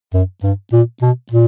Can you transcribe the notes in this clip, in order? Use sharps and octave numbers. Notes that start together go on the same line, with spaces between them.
F#2
G2
A#2
B2
A#2